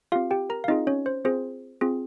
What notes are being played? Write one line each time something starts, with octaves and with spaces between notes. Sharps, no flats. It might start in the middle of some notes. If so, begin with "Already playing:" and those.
C4 F4 G4 F5
G4 G5
A#4 A#5
F5
C4 D#4 F4 G#4 D#5
C#4 C#5
C5
C4 F4 G#4 C5
C4 F4 G#4